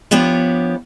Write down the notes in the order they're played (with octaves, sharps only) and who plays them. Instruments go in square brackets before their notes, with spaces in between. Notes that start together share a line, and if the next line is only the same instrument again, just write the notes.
[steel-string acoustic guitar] F3 B3 D4 G4 C#5